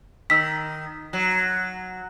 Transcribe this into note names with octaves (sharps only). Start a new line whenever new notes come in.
D#3 E6 B6
F#3